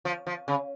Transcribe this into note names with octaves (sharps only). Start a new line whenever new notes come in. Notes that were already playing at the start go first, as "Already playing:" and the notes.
F3
F3
C#3